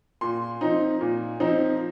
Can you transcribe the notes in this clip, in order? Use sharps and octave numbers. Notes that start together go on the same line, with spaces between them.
A#2 C6
F3 C4 D#4
A#2
F3 C4 D#4